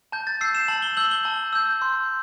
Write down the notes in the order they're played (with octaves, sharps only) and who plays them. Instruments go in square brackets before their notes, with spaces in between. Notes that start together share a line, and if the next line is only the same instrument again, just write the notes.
[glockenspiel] A5 G6
A6
E6 G6 C7
E7
A5 F#7
G7
E6 G6 F#7
G7
A5
E6 G6
C6